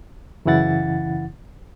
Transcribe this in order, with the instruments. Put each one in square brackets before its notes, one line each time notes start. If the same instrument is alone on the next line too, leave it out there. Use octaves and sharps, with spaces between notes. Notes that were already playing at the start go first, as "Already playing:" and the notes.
[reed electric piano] F#2 C#3 E3 E4 F#5 A6